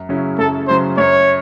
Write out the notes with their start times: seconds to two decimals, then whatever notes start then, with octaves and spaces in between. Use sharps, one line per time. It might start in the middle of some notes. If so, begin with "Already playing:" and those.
Already playing: F#2
0.09 C#3 F#3 C#4 E4
0.38 F#2 A4
0.68 C#3 F#3 C#4 E4 C5
0.97 F#2 C#5